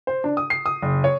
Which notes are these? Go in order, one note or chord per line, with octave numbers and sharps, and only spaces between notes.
C5
D4
D#6
C7
D#6
F#1
C#5